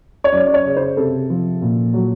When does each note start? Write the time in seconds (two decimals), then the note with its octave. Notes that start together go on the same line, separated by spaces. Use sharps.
0.24 C#5
0.32 F#2 D5
0.47 D5
0.54 C#5
0.65 C#3
0.76 C5
0.97 C3 A4
1.30 F3
1.62 A#2
1.94 F#3